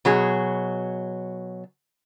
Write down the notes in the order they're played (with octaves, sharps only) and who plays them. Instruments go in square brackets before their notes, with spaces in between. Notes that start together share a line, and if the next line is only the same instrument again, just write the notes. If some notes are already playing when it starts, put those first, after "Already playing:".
[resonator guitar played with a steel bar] B2 F#3 G#4